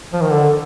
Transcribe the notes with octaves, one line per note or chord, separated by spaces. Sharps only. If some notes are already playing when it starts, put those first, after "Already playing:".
F3
D#3
D3